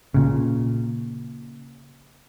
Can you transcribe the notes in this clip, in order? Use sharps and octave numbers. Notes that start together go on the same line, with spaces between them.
A#2 C#3